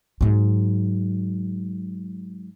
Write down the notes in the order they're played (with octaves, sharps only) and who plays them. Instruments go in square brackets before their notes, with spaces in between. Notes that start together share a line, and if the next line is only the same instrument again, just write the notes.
[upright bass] G#2 F#3